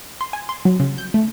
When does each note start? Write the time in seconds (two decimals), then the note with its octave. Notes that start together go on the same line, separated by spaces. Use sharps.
0.21 C6
0.33 G#5
0.49 C6
0.65 F#3
0.80 C#3
0.98 G6
1.14 A3